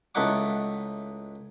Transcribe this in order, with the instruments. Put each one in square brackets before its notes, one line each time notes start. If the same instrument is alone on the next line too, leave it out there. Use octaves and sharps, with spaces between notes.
[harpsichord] C#2 A3 D#4 E4 F#5 D6